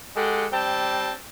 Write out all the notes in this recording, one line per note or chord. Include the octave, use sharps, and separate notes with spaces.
G#3 G4 A4 F#5
G3 C4 G5 A5